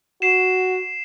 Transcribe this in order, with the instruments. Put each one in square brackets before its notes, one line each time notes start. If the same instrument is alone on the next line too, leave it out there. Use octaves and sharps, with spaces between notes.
[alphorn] F#4 [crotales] C7 E7